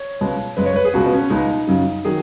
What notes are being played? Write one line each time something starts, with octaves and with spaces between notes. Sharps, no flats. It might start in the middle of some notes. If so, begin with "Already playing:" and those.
Already playing: C#5
C#2 B2 G#3
F#2 C#3 G#3 B4
C#5
B4
G#4
C#2 B2 G#3 F#4
B3
C#4
C#2 B2 G#3 D#4
F#2 C#3 F#3
D#3 F#3 G#4